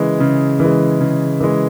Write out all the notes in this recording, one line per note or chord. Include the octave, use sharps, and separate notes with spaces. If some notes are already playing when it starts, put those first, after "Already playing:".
Already playing: C#3 E3 G#3
C#3
E3 G#3
C#3
E3 G#3